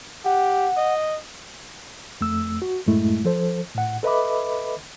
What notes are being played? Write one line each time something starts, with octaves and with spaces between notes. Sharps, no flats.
G4 F#5
D#5
F2 A3 E6
F#4
F#2 A2 G#3 A3 E4
F3 A4 C5
A2 F#5
A4 B4 D#5 E5 B5 D6